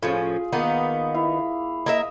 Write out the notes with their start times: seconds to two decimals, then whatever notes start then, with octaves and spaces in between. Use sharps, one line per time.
0.03 A2 F3 C#4 F4 G#4
0.53 D#3 A#3 B3 D#4
1.14 E4 F5
1.86 A#3 A#4 D#5 E5